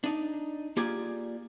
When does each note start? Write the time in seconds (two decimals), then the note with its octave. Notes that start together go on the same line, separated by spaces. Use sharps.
0.04 D4 D#4
0.77 A#3 F4 G4 G#4 D5 G#5